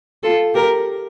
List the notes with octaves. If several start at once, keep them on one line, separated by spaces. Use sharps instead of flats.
F4 A4
G4 A#4